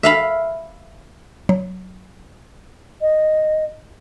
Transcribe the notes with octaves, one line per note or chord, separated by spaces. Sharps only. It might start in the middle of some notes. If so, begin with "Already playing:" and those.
E5 F5 B5
F#3
D#5